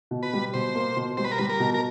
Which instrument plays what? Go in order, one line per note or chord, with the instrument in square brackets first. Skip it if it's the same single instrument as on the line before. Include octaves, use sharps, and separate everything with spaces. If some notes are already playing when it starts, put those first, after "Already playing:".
[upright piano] B2
[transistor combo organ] B4
[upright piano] G3
[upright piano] B2 [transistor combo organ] C5
[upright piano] A#3
B2
[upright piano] G3 [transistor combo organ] C5
[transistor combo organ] B4
A#4
[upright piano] G3 [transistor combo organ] B4
[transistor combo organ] A#4
[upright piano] B2
[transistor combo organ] A#4